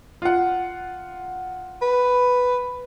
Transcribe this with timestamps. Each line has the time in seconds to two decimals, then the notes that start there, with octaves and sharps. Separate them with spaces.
0.22 F4 F#5
1.82 B4